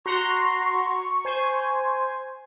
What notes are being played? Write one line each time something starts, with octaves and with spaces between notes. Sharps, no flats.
F#4 A#5 C6 C#6
C5 G#5